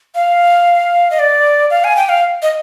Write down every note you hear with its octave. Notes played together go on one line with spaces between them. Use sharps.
F5
D#5
D5
F5
G#5
G5
F5
D#5